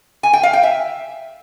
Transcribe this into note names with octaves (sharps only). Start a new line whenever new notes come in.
G#5
G5
F5
G5
E5